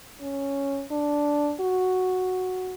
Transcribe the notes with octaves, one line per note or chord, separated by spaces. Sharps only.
C#4
D4
F#4